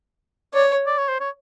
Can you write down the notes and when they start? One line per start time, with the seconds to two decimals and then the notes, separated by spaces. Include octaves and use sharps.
0.54 C#5 D5
0.87 D5
0.98 C#5
1.09 C5
1.20 C#5